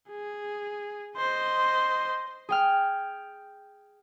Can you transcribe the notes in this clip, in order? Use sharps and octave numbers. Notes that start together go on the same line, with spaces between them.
G#4
C5 D#5
G#4 G5 F6